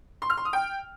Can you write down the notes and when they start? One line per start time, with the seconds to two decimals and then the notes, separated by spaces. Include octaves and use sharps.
0.22 C6
0.30 F6
0.37 C6
0.45 D#6
0.53 G5